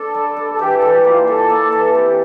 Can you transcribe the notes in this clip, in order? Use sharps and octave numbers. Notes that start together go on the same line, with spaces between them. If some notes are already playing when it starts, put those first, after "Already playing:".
Already playing: D4 A4
G3
D4
A4
E3 G4
A4
E3
G4
A#3
F4
G3 A4
A#3
E3
C4 G4